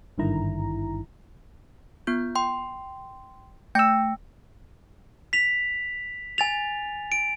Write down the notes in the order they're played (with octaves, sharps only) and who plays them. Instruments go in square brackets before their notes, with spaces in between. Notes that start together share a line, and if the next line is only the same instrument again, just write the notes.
[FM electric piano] G#1 G2 D3 D#3 E4 A#5
[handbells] B3 F4 G6
G5 C6
[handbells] A3 A#6 C#7 [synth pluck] G5 E6
[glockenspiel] B6 F7
G#5 A6 F7
D7